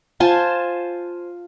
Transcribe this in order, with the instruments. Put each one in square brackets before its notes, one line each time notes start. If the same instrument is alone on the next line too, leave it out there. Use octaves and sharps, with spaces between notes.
[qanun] F4 C5 G#5 A5